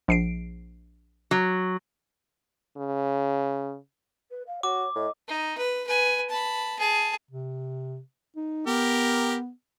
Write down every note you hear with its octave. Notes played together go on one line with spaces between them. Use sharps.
A#1 C7 D7
F#3
C#3
B4
F5
F#4 C#5 D6
A2 D#5
D#4
B4
B4 G#5
A5 B5
G#4 A5
C3
D#4
B3 G4 A#4